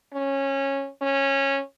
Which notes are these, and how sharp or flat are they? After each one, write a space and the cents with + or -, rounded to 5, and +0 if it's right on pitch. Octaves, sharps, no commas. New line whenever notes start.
C#4 -15
C#4 -15